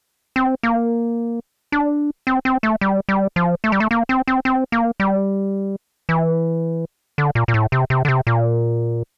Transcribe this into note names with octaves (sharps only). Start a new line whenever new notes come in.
C4
A#3
D4
C4
C4
A3
G3
G3
F3
A3
G3
A3
A#3
C4
C4
C4
A#3
G3
E3
D3
A#2
A#2
A2
C3
C3
D3
C3
A#2